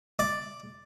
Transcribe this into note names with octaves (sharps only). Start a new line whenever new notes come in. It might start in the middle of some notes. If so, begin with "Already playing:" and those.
D5